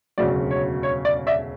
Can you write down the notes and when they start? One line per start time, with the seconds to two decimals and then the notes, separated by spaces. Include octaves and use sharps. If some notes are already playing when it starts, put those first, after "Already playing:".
0.18 E1 D2 C#3 F#3 D5
0.51 C#5
0.83 C#5
1.05 D5
1.27 D5 E5